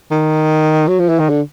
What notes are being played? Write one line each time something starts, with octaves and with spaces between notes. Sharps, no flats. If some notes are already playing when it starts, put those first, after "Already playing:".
D#3
F#3
F3
E3
D#3
D3